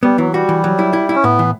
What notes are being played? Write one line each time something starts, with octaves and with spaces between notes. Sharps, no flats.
G3 B3
E3 F#3
G3 F#4
E3
F#3
E4
E4
E4
C#4
A2 B3
E3